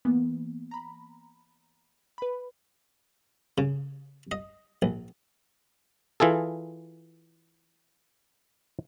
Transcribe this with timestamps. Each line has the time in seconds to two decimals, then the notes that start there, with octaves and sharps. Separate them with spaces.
0.05 E3 A#3 B3
0.71 A#5 B5
2.18 B4 B5
3.58 C#3
4.31 D#5
4.82 A#1
6.20 E3 F4 G#4 A4